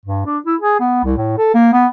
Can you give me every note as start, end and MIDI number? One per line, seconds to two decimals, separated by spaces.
0.05 0.23 43
0.26 0.38 62
0.46 0.55 64
0.60 0.78 68
0.80 1.02 59
1.04 1.15 36
1.17 1.36 45
1.38 1.51 69
1.54 1.69 58
1.73 1.86 59